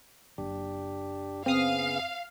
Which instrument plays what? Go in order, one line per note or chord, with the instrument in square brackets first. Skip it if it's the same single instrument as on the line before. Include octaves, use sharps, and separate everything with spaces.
[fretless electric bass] F#1 [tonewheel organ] D4 G4
[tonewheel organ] C#3 B3 G#4 [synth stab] C4 D#6 [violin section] F5